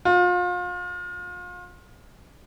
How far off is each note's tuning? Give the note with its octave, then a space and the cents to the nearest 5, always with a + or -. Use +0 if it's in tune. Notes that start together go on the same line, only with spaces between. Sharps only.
F4 +35